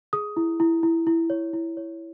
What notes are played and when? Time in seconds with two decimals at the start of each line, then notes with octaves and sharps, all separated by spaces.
0.13 G#4 D#6
0.37 E4
0.60 E4
0.83 E4
1.07 E4
1.30 C#5
1.53 E4
1.77 C#5